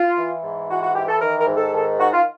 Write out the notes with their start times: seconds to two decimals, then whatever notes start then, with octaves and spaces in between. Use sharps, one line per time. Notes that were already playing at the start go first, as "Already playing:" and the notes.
Already playing: F4
0.17 E3
0.43 G#2
0.69 E3 F#4
0.82 F#4
0.95 E3 G4
1.08 A4
1.21 D#3 A#4
1.38 A#4
1.47 G#2
1.56 A4
1.73 D#3 A4
1.99 D#3 F#4
2.12 F4